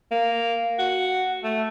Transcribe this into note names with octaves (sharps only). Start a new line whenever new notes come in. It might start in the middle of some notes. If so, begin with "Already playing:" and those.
A#3
F#4
A3